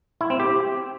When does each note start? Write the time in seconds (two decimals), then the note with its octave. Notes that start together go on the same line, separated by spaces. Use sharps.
0.21 E4
0.30 C4
0.40 G4